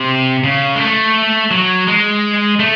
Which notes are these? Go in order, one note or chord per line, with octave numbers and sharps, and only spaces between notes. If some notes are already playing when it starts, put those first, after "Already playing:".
Already playing: C3
C#3
G#3
A3
F#3
G#3
A3